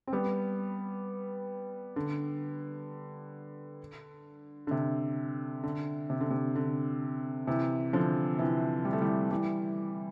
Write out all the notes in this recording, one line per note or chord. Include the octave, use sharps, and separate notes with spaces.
C4
G3 B3
D3
D3
C3
D3
C3
D3
C3
D3
C3 E3
D3 F3
C3 E3
G3
A3
E3 G3
E3 G3